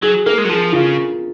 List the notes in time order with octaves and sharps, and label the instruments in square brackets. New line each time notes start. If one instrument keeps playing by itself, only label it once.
[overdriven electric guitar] F#3 [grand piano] G#4
[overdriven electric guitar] A#3 [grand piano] A#4
[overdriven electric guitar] G#3
F#3
[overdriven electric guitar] F3 [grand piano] G#4
[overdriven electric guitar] C#3 [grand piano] F4